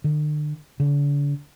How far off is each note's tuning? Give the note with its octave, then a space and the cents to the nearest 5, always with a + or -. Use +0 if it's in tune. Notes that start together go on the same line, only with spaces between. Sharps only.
D3 +40
D3 -40